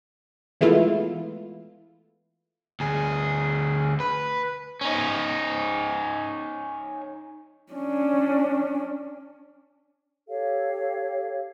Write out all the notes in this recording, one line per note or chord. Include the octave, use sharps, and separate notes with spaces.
E3 G#3 A3 B3 E4 F4
D2 G#4
B4
C#4 D#4
C#4 D4
G4 A4 C#5 F5